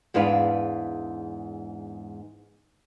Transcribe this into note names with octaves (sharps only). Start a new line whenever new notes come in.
E2 G#2 D4 B4 F5